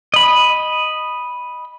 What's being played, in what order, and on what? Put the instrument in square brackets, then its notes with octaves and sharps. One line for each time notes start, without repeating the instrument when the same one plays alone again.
[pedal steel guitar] D#5 B5